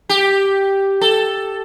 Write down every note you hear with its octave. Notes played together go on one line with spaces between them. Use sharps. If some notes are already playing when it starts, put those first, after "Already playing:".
G4
A4